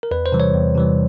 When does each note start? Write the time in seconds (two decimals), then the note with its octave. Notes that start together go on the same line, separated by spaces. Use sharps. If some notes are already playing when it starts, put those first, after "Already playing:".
0.03 A#4
0.11 E2 B4
0.26 C5
0.32 C3 E3 G3
0.40 C#5
0.54 E2
0.75 C3 E3 G3